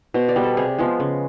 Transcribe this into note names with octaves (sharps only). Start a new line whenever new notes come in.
B2 C5
D5
G3 B3
A4
C3 G#4
F3 G#3 B3
C#3